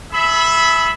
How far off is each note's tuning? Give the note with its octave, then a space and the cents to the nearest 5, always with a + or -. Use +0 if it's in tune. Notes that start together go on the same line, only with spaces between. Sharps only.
G#4 +40 E5 -5 B5 +0